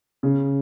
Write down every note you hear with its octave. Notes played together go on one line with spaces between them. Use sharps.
C#3